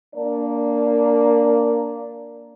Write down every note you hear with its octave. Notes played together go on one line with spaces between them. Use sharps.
A#3 D4 A#4 D5